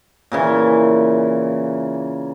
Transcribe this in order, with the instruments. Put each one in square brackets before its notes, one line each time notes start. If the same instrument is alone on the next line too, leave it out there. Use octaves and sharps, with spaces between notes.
[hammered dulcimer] A#2 C#3 E3